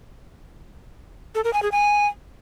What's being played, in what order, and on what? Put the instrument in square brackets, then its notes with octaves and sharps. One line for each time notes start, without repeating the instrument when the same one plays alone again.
[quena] A4
A#4
G#5
G#4
G#5